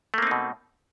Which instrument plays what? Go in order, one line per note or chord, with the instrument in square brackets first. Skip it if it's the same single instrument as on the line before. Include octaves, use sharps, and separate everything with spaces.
[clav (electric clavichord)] A3
A#3
C4
D#4
B2